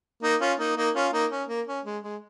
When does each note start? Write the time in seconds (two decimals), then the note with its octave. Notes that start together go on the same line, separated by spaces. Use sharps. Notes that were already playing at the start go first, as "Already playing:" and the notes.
0.22 A#3 D#4
0.40 C#4 F4
0.59 A#3 D#4
0.77 A#3 D#4
0.95 C#4 F4
1.13 A#3 D#4
1.31 C#4
1.49 A#3
1.67 C#4
1.86 G#3
2.03 G#3